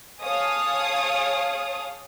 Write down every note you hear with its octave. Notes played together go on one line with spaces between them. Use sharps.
G#4 C#5 F5 A5 D#6